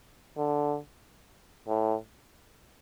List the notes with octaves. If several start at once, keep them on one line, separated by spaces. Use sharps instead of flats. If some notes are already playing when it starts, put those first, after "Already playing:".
D3
A2